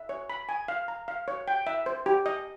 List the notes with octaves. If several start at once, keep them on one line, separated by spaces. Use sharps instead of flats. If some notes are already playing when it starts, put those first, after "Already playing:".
Already playing: E5
C#5
B5
G#5
F5
A#5
F5
C#5
G5
E5
C5
G4
D#5